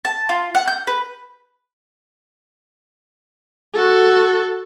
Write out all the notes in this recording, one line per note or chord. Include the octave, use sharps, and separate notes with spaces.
A5
F4
F#5
G6
B4
F#4 A4